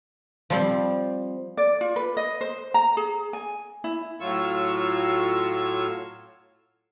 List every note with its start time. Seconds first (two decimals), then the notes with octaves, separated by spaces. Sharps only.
0.50 F3 G3 C4
1.57 D5
1.81 F4
1.96 B4
2.17 D#5
2.41 C5
2.74 A#5
2.97 G#4
3.33 G#5
3.84 E4
4.21 A2 F#3 F4 C#6 E6